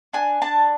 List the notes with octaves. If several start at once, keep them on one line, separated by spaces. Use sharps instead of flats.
D4 G#5
D4 A5